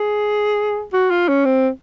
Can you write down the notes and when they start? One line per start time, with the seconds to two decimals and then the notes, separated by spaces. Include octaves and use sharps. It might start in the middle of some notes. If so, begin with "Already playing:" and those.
Already playing: G#4
0.93 F#4
1.11 F4
1.29 C#4
1.45 C4